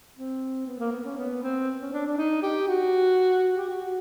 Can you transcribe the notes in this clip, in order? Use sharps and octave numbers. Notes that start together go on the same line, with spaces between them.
C4
B3
A#3
B3
C#4
B3
C4
C#4
D4
D4
D#4
G4
F#4
G4
F#4
F#4